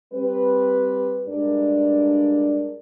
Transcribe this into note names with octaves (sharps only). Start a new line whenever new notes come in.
G3 C4 B4
G2 G#3 D4 A#4 D5